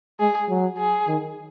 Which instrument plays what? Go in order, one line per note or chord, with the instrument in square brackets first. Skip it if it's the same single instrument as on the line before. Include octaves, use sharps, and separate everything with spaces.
[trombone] G#3 [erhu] G#4
[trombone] F#3
[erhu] G#4
[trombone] D#3